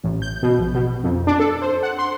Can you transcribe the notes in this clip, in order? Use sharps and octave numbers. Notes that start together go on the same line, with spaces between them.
A1
G6
B2
A#1
B2
F2
D4
A4
C5
F#5
C6